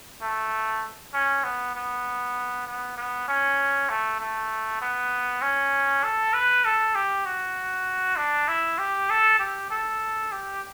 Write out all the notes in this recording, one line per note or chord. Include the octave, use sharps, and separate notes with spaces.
A3
C#4
B3
B3
B3
B3
C#4
A3
A3
B3
C#4
A4
B4
A4
G4
F#4
D4
E4
G4
A4
G4
A4
G4